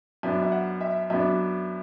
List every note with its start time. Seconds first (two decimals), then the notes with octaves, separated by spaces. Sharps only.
0.23 F#2 F#3 B3 D4 E5
0.42 E5
0.52 F#5
0.81 E5
1.10 F#2 F#3 B3 D4 E5